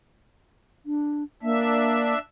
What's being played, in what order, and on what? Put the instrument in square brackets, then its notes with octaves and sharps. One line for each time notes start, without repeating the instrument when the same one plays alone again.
[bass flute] D4
[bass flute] A#3 [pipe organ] D4 E5